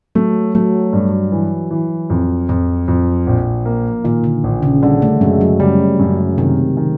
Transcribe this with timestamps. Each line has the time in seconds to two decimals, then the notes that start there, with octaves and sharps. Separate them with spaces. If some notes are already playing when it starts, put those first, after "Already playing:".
0.15 F#3 A3
0.55 F#3 A3
0.93 G2
1.32 E3
1.71 E3
2.10 F2
2.49 F2 F3
2.88 F2
3.27 A#1
3.65 A#3
4.04 A#2 D#3
4.24 D3
4.44 A#1
4.63 C#3
4.82 D3 G3
5.02 A3
5.21 F#2 G#3
5.41 F#3
5.60 C#3 G3
5.99 F#2
6.38 C3 D#3
6.77 D#3